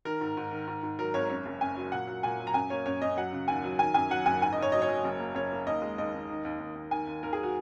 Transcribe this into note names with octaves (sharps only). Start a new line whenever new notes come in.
D#3 A#4
G#2
G#2
D#3
G#2
G#2
F#3 A#4
G#1 C#5
F#2 C#5
F#1
F#2 G#5
F#3
A#2 F#5
F#3
A#2 G#5
F#3
A#5
F#2 G#5
A#3 C#5
F#2 C#5
F#2 D#5
F#3 F#5
C#3
D#2 G#5
F#3
D#3 G#5
F#2 G#5
F#3 F#5
F#1 G#5
G#2 G#5
D#5
G#2
C#5
F#3 D#5
C#5
F#3
F#1
A#3
F#1 C#5
A#3
D#2 D#5
G#3
D#2 D#5
D#2
D#3
D#2
D#2
D#2
D#3 G#5
D#2
D#2 A#4
G#4
F#3
F#4